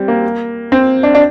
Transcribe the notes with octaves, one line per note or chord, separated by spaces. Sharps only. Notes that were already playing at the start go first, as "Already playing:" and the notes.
Already playing: G3 C4
A#3
C4
D4
D4